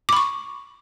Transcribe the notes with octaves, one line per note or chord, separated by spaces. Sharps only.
B5 C#6 D6